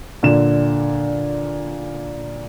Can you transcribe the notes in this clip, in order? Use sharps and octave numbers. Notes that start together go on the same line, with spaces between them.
A#2 D3 E7